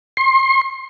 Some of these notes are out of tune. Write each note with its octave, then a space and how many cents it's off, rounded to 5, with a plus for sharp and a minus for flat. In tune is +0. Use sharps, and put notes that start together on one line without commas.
C6 +35